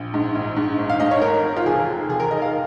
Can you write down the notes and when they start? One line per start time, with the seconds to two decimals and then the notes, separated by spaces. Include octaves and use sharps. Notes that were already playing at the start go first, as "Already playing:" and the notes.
Already playing: A#1
0.14 G#2
0.35 A#1
0.56 G#2
0.78 G#1
0.89 F5
1.00 G#2 D#5
1.11 C#5
1.22 G#1 A#4
1.43 G#1
1.57 F4
1.65 F1 G#4
1.88 D#2
2.09 F1 G#4
2.20 A#4
2.31 D#2 D#5
2.42 F5